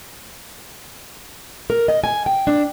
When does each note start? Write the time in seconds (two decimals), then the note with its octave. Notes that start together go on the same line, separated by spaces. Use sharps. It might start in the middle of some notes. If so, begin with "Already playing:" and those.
1.70 A#4
1.88 D#5
2.04 G#5
2.26 G5
2.47 D4